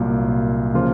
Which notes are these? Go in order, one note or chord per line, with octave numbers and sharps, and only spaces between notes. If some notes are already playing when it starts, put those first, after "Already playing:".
Already playing: C2 A#2 F#3 A#3
C#3 F3 A#3 F4 C5